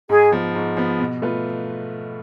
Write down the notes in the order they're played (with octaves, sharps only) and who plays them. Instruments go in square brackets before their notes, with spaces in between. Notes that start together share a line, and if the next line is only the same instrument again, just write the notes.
[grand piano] G#2 [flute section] G#4
[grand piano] F3 B3
G#2
F3 B3
B2
A3 F4 B4